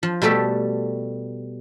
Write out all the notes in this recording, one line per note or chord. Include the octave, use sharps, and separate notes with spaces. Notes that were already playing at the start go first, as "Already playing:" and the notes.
F3
B2 G3 A3 G4 A4